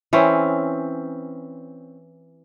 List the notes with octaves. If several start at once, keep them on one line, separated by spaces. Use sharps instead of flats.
E3 C4 C#4